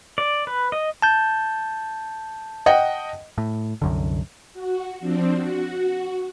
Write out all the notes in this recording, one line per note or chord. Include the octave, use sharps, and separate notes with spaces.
D5
B4
D#5
A5 G6
D#5 F#5 G5
A2
C2 F#2 D3
F#4
F3 C4 D4
F#4